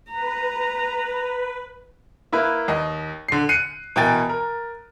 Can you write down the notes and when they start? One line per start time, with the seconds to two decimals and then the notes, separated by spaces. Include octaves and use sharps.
0.12 B4 A#5
2.33 A#3 E4 B4
2.68 D#2 D#5
3.28 D3 C7
3.49 F#6 C7 C#7 D#7
3.96 B2 E3 A#4 G5 G#5 A6
4.30 A#4